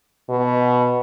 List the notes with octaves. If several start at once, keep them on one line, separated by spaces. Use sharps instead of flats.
B2